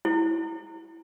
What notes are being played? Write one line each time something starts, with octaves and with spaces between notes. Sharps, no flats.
E4